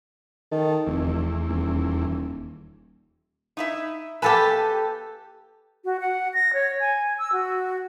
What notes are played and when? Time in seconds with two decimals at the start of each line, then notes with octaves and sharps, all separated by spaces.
0.52 D#3 A4
0.86 F1 E2
1.48 D#1
3.57 D#4 E4 E5
4.22 A#3 G4 A4 B4 G#5 A5
5.85 F#4
6.00 F#5
6.34 A#6
6.53 C#5
6.80 G#5
7.18 E6
7.33 F#4